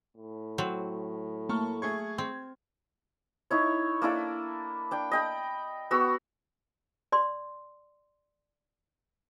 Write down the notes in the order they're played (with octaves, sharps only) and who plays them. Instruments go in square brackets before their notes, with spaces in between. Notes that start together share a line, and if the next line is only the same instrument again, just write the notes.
[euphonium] A2
[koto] F#3 C4
[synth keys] A3 A#3 [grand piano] A5 C#6 F6
[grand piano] A3 G#4 C#6 [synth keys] G#6
[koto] C4
[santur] D#4 E4 C#5
A#3 D4 E4 A4
D4 G5
D#5 G5 B5
B3 F#4 C#6 E6
[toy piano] D5 C6